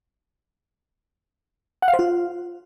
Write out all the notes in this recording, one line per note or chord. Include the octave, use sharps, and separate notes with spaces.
F#5
F5
C5
F4